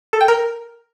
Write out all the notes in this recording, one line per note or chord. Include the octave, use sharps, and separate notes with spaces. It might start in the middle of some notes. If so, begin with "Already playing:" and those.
A4
G5
A#4